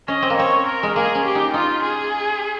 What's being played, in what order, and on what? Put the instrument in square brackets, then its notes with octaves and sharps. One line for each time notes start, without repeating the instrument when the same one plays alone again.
[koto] C#4 [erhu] D#5
[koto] C4
A#3
[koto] C4 [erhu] C#5
[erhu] A#4
[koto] G#3
[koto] A#3 [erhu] G#4
[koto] C#4
[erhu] G4
[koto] D#4
[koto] D#4 [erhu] F4
[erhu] G#4